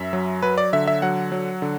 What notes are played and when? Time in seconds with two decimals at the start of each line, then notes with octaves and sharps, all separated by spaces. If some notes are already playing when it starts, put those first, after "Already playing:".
Already playing: F#2 E5
0.13 F#3
0.43 F#3 B4
0.58 D5
0.73 D3 E5
0.87 E5
1.02 F#3 F#5
1.32 F#3
1.62 D3